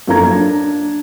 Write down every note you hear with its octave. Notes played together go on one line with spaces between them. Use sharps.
F#2 F3 A#3 A4 A#5 G#6
D4